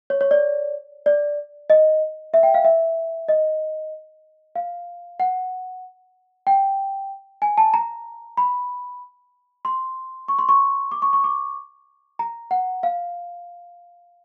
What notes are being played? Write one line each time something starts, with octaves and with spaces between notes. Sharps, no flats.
C#5
C#5
D5
D5
D#5
E5
G5
F5
E5
D#5
F5
F#5
G5
G#5
A5
A#5
B5
C6
C#6
C6
C#6
D6
C#6
C#6
D6
A#5
F#5
F5